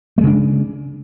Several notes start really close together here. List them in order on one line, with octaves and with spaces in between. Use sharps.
A3 G#3 C#3 D4